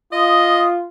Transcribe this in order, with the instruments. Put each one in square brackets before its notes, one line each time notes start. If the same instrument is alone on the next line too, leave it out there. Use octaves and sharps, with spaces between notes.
[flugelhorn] F4 [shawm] D#5 [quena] D#6